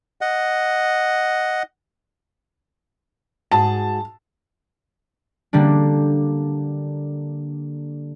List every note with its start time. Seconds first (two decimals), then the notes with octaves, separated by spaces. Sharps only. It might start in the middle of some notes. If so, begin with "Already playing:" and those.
0.21 D#5 F#5
3.51 G#2 F#4 G#4 A5
5.53 D3 G3 A#3 D4